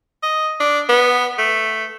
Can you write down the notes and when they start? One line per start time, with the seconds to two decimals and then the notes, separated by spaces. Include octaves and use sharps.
0.23 D#5
0.60 D4
0.89 B3
1.38 A3